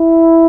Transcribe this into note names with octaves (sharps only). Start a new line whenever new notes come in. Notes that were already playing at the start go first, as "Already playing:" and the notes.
Already playing: E4